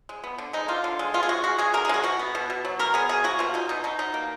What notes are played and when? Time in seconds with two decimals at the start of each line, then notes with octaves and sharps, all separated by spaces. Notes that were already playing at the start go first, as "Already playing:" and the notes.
0.09 G#3
0.24 B3
0.38 D3
0.53 G#3 D#4
0.68 D3 F4
0.84 D3
0.99 G#3
1.14 B3 F4
1.23 G#4
1.29 G#3 F#4
1.44 G#3 F#4
1.58 G#3 G#4
1.74 D3 A#4
1.85 G#4
1.89 G#3 F#4
2.04 B2 F#4
2.19 B3
2.35 B2
2.50 B2
2.65 F#3
2.79 B2 A#4
2.94 B3 G#4
3.09 B2 G#4
3.24 A#3 F#4
3.39 B2 F4
3.54 B2 D#4
3.69 B2 D#4
3.84 B2 D#4
3.99 B2 D#4
4.14 A#3